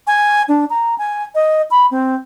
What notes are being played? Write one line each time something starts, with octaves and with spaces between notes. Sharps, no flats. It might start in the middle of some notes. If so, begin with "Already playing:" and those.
G#5
D4
A#5
G#5
D#5
B5
C4